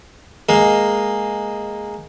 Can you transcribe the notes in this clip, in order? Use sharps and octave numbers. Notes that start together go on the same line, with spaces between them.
G#3 A#3